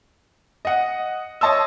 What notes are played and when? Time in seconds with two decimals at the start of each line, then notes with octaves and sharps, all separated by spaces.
0.65 D#5 F#5
1.41 C#5 D#5 A5 C6 E6